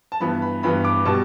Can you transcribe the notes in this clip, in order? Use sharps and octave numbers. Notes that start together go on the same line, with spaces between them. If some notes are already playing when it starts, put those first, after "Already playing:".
A5
G2 E3 B3 B5
B5
G2 E3 B3 B5
D6
B2 G3 A5